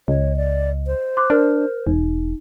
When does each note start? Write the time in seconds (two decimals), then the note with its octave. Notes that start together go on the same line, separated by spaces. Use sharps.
0.08 C#2 C#5 D#5
0.37 D5
0.87 C5
1.17 C6 D6 F#6
1.30 D4 A#4 F6
1.87 E1 D#4